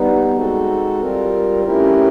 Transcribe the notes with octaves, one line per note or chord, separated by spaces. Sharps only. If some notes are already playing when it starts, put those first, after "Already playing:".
Already playing: G3 B3 D#4
G#3 C4 D#4 F#4 A4
G3 C4 F4 A#4
A3 C#4 E4 G4 A#4